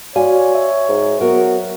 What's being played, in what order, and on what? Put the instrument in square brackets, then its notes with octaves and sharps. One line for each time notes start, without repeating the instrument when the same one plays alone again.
[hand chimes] F#4 D5 F5 [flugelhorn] C#5 [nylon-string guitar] G#5
[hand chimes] E5
[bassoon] G#2
[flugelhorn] F#3 [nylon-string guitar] B3 A#4 [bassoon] F#4